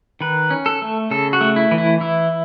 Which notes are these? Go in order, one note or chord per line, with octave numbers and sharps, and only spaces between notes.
D#3 B4
C#4
A4
A3
C#3 A4
F#4
A3
E4
E3
E4
E3 E4